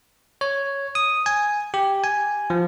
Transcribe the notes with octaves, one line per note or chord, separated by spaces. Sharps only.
C#5
D#6
G#5
G4
G#5
F3